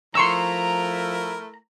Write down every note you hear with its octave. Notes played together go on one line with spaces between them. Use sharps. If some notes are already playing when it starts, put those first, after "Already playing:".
F3 A3 E4 A#4 A#5 C6 C#6 E6